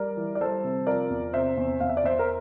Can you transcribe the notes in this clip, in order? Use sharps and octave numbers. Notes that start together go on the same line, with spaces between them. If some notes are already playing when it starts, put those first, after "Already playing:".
Already playing: G3 A#4 D5
E3
D5
G3 A4 C5
C3
F3 A#4 D5
E2
C3 C5 E5
E2
E2 F5
E5
D5
E2 C5 E5
A#4